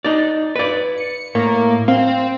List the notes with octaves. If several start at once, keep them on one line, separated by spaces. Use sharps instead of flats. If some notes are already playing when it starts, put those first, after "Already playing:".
D#4 D5
B4 D5
C#7
A2 A#3
C4 F5